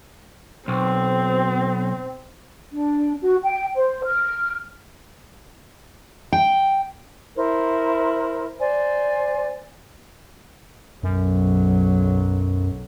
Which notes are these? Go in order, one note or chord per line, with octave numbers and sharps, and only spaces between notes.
B1 C4
D4
F#4
G5
C5
F6
G5
E4 A#4 C5
C5 D5 G#5
B1 F#2 F#3